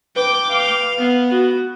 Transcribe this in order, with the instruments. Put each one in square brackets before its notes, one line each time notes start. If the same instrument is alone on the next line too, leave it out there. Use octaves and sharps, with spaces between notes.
[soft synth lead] B4 [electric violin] G5 D6
[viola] F5
[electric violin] B3
[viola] F#4